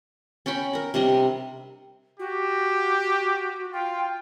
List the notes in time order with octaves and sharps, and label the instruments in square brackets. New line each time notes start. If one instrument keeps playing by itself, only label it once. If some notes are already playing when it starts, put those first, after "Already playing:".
[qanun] C#4 C#5 G5 B5
A#4 A#5
C3 G3 D4 D#5
[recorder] F#4 [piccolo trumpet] G4
[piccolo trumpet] F4 [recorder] G5